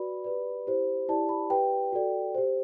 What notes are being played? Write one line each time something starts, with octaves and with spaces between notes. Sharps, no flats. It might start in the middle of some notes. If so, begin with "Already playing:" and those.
Already playing: F#4 B4 D5 B5
G4 B4 D5
E4 G4 C5
E4 G4 D5 A5
B5
G4 B4 D5 G5
F#4 A4 D5
G4 C5